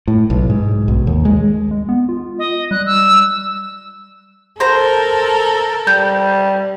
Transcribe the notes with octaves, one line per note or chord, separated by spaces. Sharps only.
A2
B1
G#2
B1
D#2
G#3
G#3
B3
F4
D#5
G3 F#6
E6
A4 A#4 C5 A#5
G3 G6